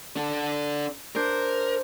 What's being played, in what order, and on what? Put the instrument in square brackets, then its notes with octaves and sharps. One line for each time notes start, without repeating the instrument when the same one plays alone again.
[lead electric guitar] D4 A4
[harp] D4 C5 [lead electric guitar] A#4